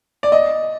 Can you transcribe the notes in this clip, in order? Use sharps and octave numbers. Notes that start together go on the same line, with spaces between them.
D5
D#5